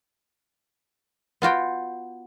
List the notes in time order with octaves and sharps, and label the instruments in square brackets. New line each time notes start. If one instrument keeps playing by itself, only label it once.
[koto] B3 F4 F#4 G5